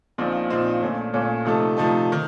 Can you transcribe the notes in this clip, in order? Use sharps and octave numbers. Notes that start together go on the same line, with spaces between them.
A#1 A#2 F3 C4 D#4
A#1 A#2 F3 C4 D#4
A#1 A#2 A3 C#4
A#1 A#2 A3 C#4
C3 F3 A3 D#4 A4
C3 F3 A3 D#4 A4
D#3